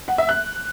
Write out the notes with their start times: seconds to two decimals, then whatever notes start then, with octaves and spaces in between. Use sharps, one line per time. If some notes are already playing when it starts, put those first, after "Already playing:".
0.08 F#5
0.18 E5
0.29 F#6